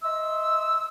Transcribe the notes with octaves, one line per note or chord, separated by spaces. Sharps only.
D#5 E5 C6 E6